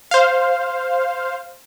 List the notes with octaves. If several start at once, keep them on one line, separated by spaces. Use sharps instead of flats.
C5 F5